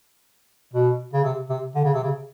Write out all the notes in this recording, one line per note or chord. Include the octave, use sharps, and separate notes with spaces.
B2
C#3
C3
C3
D3
C#3
C3
C#3